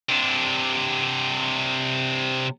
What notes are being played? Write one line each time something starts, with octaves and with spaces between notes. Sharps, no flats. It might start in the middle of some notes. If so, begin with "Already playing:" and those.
C3 D4